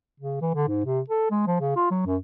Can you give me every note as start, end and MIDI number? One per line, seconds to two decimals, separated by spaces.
0.20 0.40 49
0.42 0.52 52
0.55 0.66 50
0.68 0.85 44
0.86 1.00 48
1.10 1.31 69
1.31 1.45 56
1.47 1.60 53
1.61 1.71 49
1.76 1.86 65
1.91 2.01 54
2.06 2.17 42